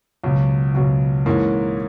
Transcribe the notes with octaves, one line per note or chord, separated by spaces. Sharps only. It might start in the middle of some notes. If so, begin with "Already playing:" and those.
C#2 B2 F#3
C#2 B2 F#3
G#2 E3 A#3 C#4